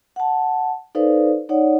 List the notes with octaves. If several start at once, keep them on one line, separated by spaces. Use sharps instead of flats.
F#5 A5
D#4 A4 B4 C5 D5 F5
D#4 C#5 D5 F#5